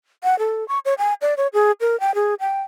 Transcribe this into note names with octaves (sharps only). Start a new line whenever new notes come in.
F#5
A4
C#6
C#5
G#5
D5
C#5
G#4
A#4
G5
G#4
G5